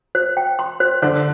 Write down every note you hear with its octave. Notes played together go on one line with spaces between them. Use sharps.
C5
G5
C6
C5
D3 D4 C5